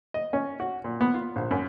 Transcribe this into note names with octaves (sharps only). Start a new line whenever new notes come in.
D#5
C#4
F#4
A#2
B3
F4
A#1
F#2